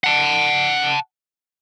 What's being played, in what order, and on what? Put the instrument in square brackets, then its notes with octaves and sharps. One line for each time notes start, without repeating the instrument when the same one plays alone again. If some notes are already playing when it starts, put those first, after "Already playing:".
[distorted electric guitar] F#5 A5